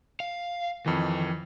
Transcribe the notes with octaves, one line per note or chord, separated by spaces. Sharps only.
F5
F2 D#3 E3